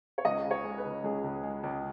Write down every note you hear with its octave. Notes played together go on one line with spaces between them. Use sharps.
C#5
C#2 D#5
C#3
C#5
G#3
B4
C#3
C#2 G#4
C#2
G#3
C#2